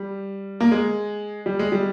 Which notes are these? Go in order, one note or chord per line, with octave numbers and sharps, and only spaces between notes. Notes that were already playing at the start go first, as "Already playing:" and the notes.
Already playing: G3
A#3
G#3
G3
G#3
G3